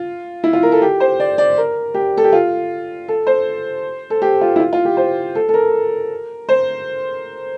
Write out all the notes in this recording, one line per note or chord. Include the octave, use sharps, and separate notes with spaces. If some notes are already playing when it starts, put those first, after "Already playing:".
Already playing: F4
E4
F4
A#4
A4
G4
C5
D5
D5
A#4
G4
A4
G4
F4
A4
C5
A4
G4
F4
E4
F4
F4
G4
C5
A4
A4
A#4
C5